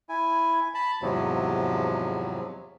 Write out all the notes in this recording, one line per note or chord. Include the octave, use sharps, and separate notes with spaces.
E4 G#5
A5 B5
E2 G#2 C3 F3 F#3